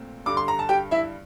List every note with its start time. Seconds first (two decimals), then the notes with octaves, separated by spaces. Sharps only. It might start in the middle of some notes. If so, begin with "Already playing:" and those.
Already playing: A#2 A3 C4
0.26 G2 D3 G3 D6
0.37 C6
0.48 A#5
0.59 A5
0.69 G4 G5
0.91 E4 E5